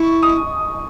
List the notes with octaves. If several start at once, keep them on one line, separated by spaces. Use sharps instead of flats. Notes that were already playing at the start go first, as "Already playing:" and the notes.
Already playing: E4 C#6
D#6